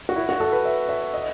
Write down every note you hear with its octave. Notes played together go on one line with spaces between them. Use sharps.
F#4
E4
F#4
A4
B4
E5
E5
D#5